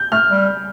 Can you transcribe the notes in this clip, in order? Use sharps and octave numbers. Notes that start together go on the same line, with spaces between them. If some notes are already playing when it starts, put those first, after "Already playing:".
Already playing: G6
A3 F6
G3